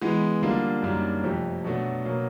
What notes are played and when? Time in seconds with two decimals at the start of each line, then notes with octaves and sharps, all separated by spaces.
0.02 E3 G#3 B3
0.42 D3 G3 A#3 D4 F4
0.82 F#2 D#3 G3 A#3 D4
1.24 F2 C3 F3 A3
1.64 B2 F#3 A3 D4 F#4
2.05 B2 F#3 A#3